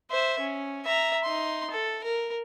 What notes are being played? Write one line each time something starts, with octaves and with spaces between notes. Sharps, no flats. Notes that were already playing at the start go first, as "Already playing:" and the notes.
C5 E5
C#4
E5 A#5
D#4 C6
A4
A#4